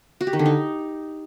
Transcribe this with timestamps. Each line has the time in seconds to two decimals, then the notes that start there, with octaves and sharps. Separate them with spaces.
0.21 F#4
0.27 G4
0.33 D#3
0.39 D3
0.46 D#4